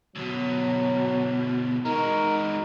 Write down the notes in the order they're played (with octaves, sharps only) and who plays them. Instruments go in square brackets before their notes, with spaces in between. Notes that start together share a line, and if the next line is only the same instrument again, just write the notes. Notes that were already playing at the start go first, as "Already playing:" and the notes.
[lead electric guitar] D2 B2 [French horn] F#3
[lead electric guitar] G#3 F#4 [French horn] D#4 [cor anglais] A#4